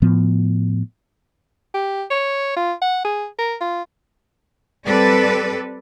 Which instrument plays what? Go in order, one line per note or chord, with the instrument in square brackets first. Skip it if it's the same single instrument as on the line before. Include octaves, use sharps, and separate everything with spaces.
[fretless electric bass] A2 F3 B3
[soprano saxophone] G4
C#5
F4
F#5
G#4
A#4
F4
[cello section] G3 C4 A4 B4 D5